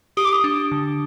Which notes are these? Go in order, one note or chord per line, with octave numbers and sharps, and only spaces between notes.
G4 D#6
D6
D#6
D4
D3